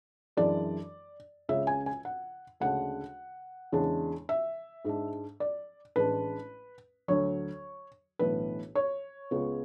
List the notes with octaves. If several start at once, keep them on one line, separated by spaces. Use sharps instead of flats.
F#2 E3 G#3 D4 D5
C#2 C#3 G#3 C#4 E5
G#5
G#5
F#5
D2 C#3 G#3 D4 F#5
E2 C#3 G#3 D4
E5
G#2 G#3 D4
D5
A1 A2 G#3 D4 B4
D2 D3 F#3 C#5
B1 A2 E3 B3 D4 B4
C#5
C#2 C#3 G#3 B3